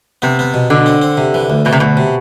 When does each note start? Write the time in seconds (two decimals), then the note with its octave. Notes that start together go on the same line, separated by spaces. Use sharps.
0.22 C3 B3
0.39 B3
0.54 B2
0.70 B2 D3
0.86 C4
1.02 C4
1.17 C3
1.34 E3
1.50 D2
1.65 B2 E3
1.73 C3
1.80 D2 B2
1.97 C3